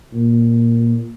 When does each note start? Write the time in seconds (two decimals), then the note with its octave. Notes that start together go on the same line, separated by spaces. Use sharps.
0.13 A#2